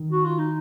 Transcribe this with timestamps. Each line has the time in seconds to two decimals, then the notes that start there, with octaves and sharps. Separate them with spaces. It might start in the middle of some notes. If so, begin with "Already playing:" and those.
Already playing: D#3
0.12 F#4
0.25 F4
0.38 D#4